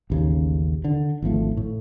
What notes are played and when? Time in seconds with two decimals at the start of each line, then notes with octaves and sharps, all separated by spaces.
0.10 A1 D#2 C#3
0.84 D3
1.22 G#1 D2 F3 A3
1.57 A2